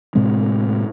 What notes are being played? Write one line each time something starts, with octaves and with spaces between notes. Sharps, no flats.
A2 C3 G#3 C4